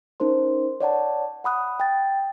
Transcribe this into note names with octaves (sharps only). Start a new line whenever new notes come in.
C#4 D#4 A#4 C5 C6
C#5 D5 F#5 A5
F#5 B5 D#6 F#6
G5 A6